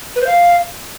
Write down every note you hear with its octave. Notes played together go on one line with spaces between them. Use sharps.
B4
C5
F5